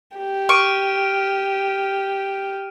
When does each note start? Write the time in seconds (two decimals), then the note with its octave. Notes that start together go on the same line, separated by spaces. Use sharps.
0.16 G4
0.49 C#6 F6 D7 D#7